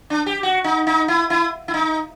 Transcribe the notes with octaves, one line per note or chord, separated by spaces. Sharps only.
D4
G4
F#4
D#4
D#4
E4
E4
E4
D#4